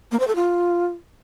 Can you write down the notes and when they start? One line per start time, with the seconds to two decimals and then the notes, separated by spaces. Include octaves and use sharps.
0.12 A#3
0.19 C5
0.27 A4
0.35 F4